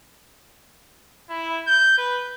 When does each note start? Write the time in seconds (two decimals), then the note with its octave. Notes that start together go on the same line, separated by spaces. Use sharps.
1.30 E4
1.67 G6
1.97 B4